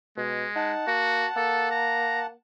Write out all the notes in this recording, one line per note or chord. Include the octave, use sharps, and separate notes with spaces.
B2 G#3
D#4 F#5 A5
A#3 F#4
A#3 A4
A#5